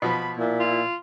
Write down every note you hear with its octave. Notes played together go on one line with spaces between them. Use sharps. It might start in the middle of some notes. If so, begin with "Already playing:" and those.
B2 F3 B5
A#2 E4
F4